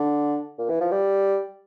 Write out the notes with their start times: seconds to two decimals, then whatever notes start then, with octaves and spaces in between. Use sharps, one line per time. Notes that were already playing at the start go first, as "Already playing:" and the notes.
Already playing: D3
0.59 A#2
0.70 E3
0.81 F3
0.92 G3